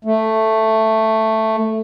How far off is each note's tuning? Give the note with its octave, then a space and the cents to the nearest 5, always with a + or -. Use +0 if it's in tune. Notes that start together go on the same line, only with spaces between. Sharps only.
A3 +5